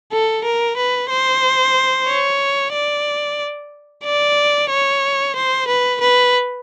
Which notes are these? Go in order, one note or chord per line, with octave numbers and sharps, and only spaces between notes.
A4
A#4
B4
C5
C#5
D5
D5
C#5
C5
B4
B4